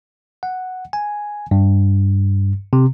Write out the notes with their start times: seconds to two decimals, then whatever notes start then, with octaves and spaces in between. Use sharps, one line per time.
0.43 F#5
0.93 G#5
1.51 G2
2.73 C3